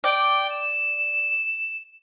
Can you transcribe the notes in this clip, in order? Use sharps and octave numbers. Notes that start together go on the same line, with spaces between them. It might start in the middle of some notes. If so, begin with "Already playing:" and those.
D5 G5
E7